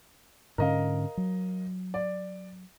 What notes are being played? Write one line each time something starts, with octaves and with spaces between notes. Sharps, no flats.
G#2 D3 C#4 A#4 D#5 F5
F#3
D5